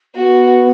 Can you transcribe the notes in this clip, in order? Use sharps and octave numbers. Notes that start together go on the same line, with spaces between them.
B3 F#4